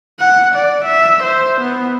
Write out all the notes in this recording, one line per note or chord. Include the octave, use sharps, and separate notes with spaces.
F#5
D5
E5
C5
B3